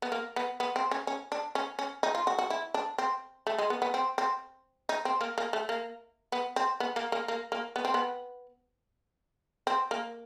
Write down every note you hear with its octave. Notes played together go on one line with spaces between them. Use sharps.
B3
A#3
B3
B3
C4
C#4
C#4
D4
C#4
C#4
D#4
F4
F#4
F#4
E4
D4
C4
A3
G#3
B3
B3
C4
C4
D#4
C4
A#3
A#3
A3
A#3
B3
C4
B3
A#3
A#3
A#3
A#3
B3
C4
B3
C4
A#3